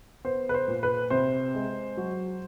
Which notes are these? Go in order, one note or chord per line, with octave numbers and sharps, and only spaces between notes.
B3 C5
B4
C5
A#2
B4
C3 C5
G#3
F#3